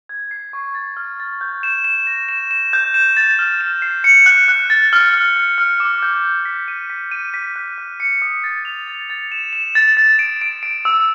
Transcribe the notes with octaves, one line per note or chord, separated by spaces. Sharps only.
G#6
C7
C#6
A6
F6
A6
G6
E7
E7
A#6
E7
E7
G6
E7
A6
F6
E7
C7
C#7
F#6
F#6
A6
F6
F6
F6
F6
D6
G6
D6
B6
D#7
B6
D#7
B6
F#6
F#6
C#7
D#6
A6
F7
A6
A6
E7
E7
A6
A6
D7
D7
D7
E6